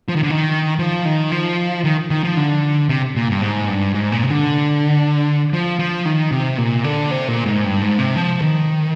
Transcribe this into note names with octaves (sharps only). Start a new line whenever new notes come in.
F3
D#3
D3
D#3
F3
D#3
F3
D#3
D#3
F3
D3
C3
A#2
G2
G#2
G2
G#2
A#2
C3
D3
F3
F3
D#3
C3
A#2
D3
C3
A#2
G#2
G2
G#2
C3
F3
D#3